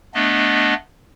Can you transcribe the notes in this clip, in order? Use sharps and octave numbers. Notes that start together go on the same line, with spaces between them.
A3 B3 D4 D#5